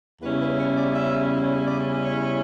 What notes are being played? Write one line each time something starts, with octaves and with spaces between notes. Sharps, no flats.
E2 C#3 G3 C#4 E4 B4
B4
C#5
D5
E5
D5
C#5